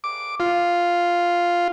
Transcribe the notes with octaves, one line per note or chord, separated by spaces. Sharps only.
D6
F4